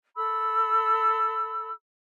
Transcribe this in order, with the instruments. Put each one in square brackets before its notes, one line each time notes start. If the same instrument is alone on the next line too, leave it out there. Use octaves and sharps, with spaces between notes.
[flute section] A4 B5 E6